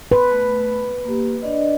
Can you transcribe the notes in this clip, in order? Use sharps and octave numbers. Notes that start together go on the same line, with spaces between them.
B4 C6
A3
A#3 G4
D4 D5 D#5